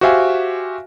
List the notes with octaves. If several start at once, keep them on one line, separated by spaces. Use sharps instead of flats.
F#4 G4 C5 E5 F5 G#5